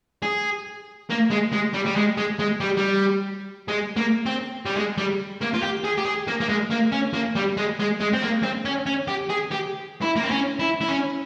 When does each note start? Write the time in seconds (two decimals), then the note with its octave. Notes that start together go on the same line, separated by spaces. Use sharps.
0.23 G#4
1.10 A#3
1.30 G#3
1.52 G#3
1.73 G3
1.85 G3
1.96 G#3
2.17 G#3
2.39 G#3
2.60 G3
2.77 G3
3.68 G#3
3.97 A#3
4.26 C4
4.66 G3
4.77 G#3
4.98 G3
5.41 A#3
5.54 F4
5.62 G4
5.85 G#4
5.98 G4
6.06 G#4
6.28 A#3
6.41 A#3
6.49 G#3
6.71 A#3
6.92 C#4
7.14 A#3
7.35 G3
7.57 G#3
7.79 G#3
8.00 G#3
8.13 C4
8.22 A#3
8.43 C4
8.65 C#4
8.86 C#4
9.08 G4
9.30 G#4
9.52 G4
10.02 E4
10.16 A#3
10.23 C4
10.31 C#4
10.60 E4
10.81 E4
10.89 C#4